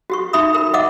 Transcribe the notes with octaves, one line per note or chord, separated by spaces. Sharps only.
F#4 G4 C#6
D#4 F#4 E5 B5 D#6
A#4 B5
D#5 E5 F#5 D6 E6